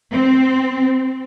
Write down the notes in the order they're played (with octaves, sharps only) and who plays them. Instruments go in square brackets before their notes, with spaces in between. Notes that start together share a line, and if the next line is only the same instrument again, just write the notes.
[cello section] C4